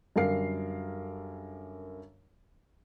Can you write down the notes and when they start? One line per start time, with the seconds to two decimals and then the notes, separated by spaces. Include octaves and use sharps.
0.16 F#2 D3 G3 A#4 F5 C7